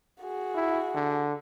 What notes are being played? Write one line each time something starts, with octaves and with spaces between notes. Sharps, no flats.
F#4 G#4
E4
D3